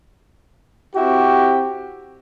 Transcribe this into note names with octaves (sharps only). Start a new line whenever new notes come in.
C4 E4 F#4 G4